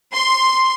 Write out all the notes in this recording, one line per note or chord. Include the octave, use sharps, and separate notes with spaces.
C6